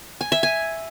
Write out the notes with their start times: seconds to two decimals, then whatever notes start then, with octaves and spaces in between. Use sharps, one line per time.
0.21 G#5
0.32 E5
0.43 G#5